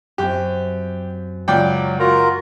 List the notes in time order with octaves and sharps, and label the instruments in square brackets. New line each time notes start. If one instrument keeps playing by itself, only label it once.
[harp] F#2 C4 [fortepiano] G4
[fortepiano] C#2 D5 G5 [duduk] F#3
[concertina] F4 A#4 A#5 [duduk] F#4